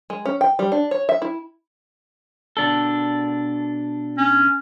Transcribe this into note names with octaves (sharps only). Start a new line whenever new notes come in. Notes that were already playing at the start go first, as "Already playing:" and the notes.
G#3
C#4
G5
G3
D4
C#5
E5
E4
B2 D4 A4
C#4